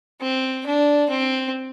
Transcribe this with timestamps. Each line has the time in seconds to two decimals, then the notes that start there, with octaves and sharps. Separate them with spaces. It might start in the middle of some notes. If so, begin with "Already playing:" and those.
0.21 C4
0.66 D4
1.09 C4